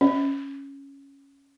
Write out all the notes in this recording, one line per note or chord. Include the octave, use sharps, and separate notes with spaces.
C#4